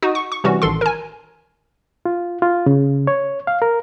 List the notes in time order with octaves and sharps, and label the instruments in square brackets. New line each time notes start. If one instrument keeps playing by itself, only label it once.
[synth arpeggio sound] D#4 F#4 D#6
C#6
C#6
C3 E3 G3 C#4 F#4
A1 D#3 A4 C6
A#4 G#5
[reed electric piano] F4
F4
C#3
C#5
F5
A#4